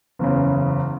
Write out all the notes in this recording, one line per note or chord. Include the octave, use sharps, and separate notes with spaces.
F#1 E2 C#3